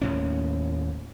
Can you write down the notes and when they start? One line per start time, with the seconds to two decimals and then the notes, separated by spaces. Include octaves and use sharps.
0.02 D#2 A2 C#4